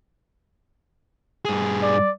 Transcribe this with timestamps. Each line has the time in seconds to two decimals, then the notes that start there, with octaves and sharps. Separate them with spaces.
1.45 G2 G#4
1.83 D5